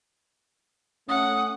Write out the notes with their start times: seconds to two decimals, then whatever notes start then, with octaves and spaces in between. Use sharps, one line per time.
1.09 A3 C#4 F#5 D#6